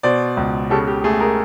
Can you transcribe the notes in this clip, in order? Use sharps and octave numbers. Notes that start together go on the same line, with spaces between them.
B2 C5 D5
C#2
C#3 G4 A4
G4
A3 G#4
G#4 A#4